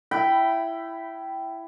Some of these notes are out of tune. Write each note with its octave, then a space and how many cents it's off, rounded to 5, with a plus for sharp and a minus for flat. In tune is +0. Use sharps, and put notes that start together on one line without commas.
E4 +15 G5 -15 B5 +0